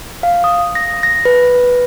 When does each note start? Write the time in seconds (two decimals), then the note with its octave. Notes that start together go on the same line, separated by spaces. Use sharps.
0.23 F5
0.44 D#6
0.75 A#6
1.03 A#6
1.25 B4